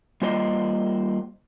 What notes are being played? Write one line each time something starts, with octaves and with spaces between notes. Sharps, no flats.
G3 A#3 F4 C5 D5 D#5